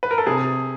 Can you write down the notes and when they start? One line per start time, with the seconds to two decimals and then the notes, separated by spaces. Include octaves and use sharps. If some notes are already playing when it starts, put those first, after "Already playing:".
0.03 B4
0.11 A#4
0.18 A4
0.27 C3 G#4